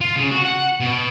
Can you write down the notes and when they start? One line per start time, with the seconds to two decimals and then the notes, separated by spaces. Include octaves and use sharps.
0.01 F4
0.16 C#3
0.31 F#4
0.45 F#5
0.80 B2